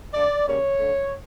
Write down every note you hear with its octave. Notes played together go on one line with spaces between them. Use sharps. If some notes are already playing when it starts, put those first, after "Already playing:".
D3 A3 D5
C#3 G3 A#3 C#5
D3 A3